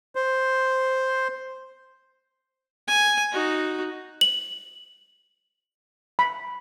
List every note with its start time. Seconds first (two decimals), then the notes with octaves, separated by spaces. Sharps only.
0.15 C5
2.87 G#5
3.32 D#4 F#4
4.21 F#7
6.19 B5